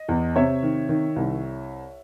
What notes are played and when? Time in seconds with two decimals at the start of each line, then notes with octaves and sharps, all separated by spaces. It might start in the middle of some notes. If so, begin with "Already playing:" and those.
Already playing: D#5
0.09 E2
0.36 C3 C#5 E5
0.63 D#3
0.89 D#3
1.16 C2